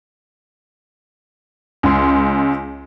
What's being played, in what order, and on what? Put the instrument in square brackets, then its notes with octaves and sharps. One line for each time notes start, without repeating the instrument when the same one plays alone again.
[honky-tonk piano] C#2 C6